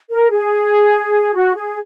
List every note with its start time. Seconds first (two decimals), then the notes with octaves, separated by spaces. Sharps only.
0.10 A#4
0.30 G#4
1.34 F#4
1.55 G#4